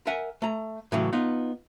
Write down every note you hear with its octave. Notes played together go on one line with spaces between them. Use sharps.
A#4 E5 F#5 G#5
A3 A#5
A2 C#3 E3 F#3
B3 D#4 F4